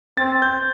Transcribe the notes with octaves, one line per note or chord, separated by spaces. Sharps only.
C4 A6
G6